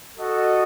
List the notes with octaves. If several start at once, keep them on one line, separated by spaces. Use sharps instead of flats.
F#4 A4 D#5